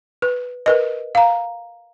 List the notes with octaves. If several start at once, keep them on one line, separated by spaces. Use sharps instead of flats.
B4
A#4 B4 D#5
F5 A#5